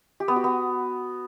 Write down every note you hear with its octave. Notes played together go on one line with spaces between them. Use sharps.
G4
B3
F#4
B3